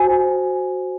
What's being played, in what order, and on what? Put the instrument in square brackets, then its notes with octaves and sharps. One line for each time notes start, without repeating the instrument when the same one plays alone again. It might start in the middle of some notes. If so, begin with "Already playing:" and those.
Already playing: [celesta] F#4 C5 G#5